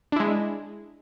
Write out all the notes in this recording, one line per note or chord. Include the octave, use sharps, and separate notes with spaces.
G#3 D4 E4